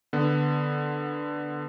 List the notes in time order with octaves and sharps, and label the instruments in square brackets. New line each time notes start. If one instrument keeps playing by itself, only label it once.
[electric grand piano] D3 B3